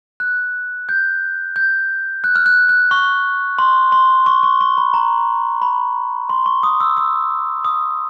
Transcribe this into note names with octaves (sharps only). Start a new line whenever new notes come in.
F#6
G6
G6
F#6
F6
F#6
F#6
C#6
C6
C6
C#6
C#6
C#6
B5
A#5
B5
C6
C#6
D#6
E6
E6
D#6